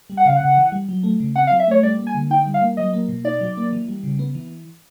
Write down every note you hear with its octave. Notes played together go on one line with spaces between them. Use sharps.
G3
F#5
C#3 F5
C#3 F#5
E3
G3
F#3
A3
C#3
C4 F#5
F5
F#3
E5
A3 C#5
G3 D5
A#3
G#5
D3
D#4 G5
G3
F5
A#3
F#3 D#5
A#3
B2
D#4 D5
F#3
A#3
E3
G3
C#3
B3
E3